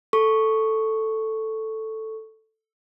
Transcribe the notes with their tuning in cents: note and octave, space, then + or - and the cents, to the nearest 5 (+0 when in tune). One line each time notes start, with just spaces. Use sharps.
A4 +0 C#6 +0